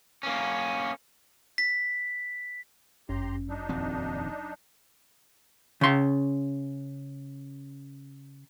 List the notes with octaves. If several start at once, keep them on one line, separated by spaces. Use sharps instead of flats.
A#3 C#4
B6
G1 F#2 C#4 G4 A#5 C6
F#3 D4 D#4
D#1 F2 C4
C#3 C6